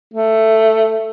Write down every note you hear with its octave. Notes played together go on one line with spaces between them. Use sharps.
A3